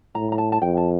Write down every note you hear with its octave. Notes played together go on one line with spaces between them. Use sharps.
A2 A#5
A#5
A5
A5
F2 G5
A5